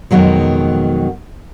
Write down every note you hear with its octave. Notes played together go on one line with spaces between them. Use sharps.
F2 B2 D#3 F#3 G#3